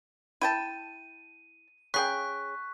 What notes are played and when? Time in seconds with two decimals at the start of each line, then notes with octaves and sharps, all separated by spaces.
0.41 E4 G5 A5 D#7
1.94 C#3 G#4 G5 C#6 F#6 B6